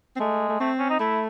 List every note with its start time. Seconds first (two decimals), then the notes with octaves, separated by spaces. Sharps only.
0.16 C4
0.19 G#3 A3
0.49 A3
0.60 A3 C4
0.79 C#4
0.90 D#4
1.00 A3 E4